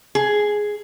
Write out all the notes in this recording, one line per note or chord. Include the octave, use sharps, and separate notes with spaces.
G#4